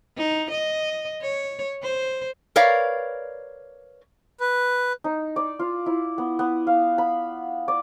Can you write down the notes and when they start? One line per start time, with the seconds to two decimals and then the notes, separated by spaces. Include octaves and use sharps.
0.18 D#4
0.51 D#5
1.22 C#5
1.83 C5
2.56 A#4 B4 C#5 D5 F5
4.40 B4
5.04 D#4
5.36 D5
5.59 F4
5.86 E4
6.18 B3
6.39 B3
6.67 F5
6.98 B5
7.68 D5